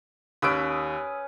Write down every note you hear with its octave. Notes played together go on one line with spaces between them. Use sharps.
D#2 C#4 B4 D#6 E6 D7